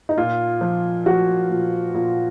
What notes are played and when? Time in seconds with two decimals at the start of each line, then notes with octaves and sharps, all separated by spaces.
0.09 D#4
0.18 A#2 F4
0.61 F3
1.06 F3 F#4
1.50 A#2
1.94 A#2 F4